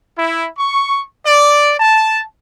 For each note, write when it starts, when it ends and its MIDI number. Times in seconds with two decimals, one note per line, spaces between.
0.16 0.47 64
0.59 1.03 85
1.26 1.74 74
1.79 2.23 81